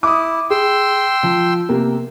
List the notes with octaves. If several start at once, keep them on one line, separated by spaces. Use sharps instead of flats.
E4 D6 D#6
G#4 G5 C6 E6
F3
C3 A#3 B3